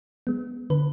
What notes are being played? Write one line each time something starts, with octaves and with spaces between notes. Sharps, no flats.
G#3 B3
D3 B4